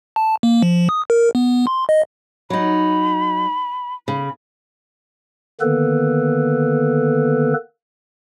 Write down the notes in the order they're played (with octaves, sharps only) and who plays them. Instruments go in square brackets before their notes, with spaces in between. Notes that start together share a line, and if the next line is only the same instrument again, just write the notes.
[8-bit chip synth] A5
A#3
F3
D#6
A#4
B3
C6
D#5
[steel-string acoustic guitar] F#3 D#4 [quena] B5
[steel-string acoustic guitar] C#3 [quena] B5
[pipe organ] D3 D#3 A#3 B3 A4 B4